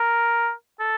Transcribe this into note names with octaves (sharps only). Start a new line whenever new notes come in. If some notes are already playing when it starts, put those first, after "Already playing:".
Already playing: A#4
A4